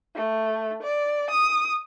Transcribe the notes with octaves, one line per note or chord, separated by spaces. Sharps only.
A3
D5
D#6